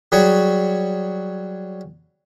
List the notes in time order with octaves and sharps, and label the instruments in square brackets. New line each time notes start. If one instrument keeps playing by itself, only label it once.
[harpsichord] F#3 G3 F#4 G#4 C#5